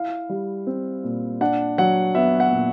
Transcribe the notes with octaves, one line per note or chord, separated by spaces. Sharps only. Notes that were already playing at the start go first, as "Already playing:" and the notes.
Already playing: E4 F5
G3
C4
A#2
D4 F#5
F#3 F#5
B3 E5
F#5
A#2